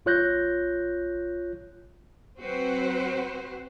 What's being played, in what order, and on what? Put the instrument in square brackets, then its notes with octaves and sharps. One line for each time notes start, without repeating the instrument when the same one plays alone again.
[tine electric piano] A#1 F4 C#5 F#6 G6 A#6
[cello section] F#3 C4 F#4 B4 C5